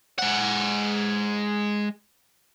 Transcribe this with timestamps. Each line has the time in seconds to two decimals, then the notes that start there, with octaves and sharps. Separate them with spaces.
0.19 G#3 F#5